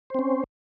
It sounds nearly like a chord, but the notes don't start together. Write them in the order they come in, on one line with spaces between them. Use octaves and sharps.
C5 C4 C#4